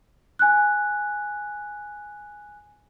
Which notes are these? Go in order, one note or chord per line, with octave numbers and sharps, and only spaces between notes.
G#5 F#6